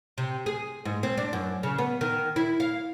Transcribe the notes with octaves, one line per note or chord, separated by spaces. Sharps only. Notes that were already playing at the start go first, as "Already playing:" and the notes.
C3
G#4
G#2
C4
D4
F#2
C#3
B3
D#3
E4
F5